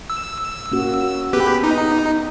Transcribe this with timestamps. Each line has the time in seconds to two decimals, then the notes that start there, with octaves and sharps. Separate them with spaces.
0.10 E6
0.72 A#3 C#4 F#4
1.33 B3 G4 G#4 B4
1.64 D#4